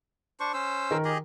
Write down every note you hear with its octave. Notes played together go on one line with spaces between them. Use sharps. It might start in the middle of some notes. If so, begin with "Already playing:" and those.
D4 C5 C#6
C#4 C5 E6
D#3 A#4
G4 G#4 D#5